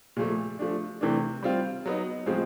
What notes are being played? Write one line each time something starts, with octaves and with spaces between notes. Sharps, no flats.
A#2 F3 A3
F3 A3 D4
C3 E3 A3 D4
G3 C4 F4
F#3 B3 D#4
A2 F3 G#3 C4